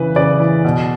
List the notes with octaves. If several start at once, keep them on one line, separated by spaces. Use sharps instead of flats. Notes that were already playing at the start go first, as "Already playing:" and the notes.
Already playing: C#3 E3 B4
C#3 D5
E3
B2